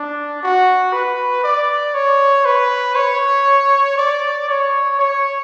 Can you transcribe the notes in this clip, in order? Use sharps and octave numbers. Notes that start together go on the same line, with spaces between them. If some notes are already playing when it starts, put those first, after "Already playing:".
Already playing: D4
F#4
B4
D5
C#5
B4
C#5
D5
C#5
C#5